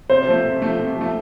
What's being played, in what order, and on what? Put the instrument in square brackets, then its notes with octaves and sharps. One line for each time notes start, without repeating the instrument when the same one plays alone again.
[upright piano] C3 [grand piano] C5
[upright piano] F3 A3
C3
F3 A3
C3
F3 A3